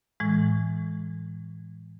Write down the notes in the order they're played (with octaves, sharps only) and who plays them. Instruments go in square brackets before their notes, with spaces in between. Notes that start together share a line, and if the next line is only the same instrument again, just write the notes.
[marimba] A2 E3 G#3